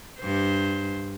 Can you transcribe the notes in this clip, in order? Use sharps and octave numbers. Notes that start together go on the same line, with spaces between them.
G2 C5